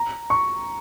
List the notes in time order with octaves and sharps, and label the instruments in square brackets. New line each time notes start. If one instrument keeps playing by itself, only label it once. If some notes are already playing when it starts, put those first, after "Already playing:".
Already playing: [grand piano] A#5
C#6